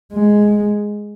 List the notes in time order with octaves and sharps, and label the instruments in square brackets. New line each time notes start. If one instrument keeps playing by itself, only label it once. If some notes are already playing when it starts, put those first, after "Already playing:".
[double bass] G#3